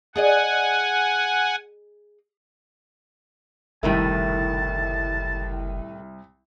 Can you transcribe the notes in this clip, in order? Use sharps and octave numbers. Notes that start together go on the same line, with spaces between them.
G#4 D5 D#5 F#5 G#5
F#1 C2 A2 D#3 A3 E4 A5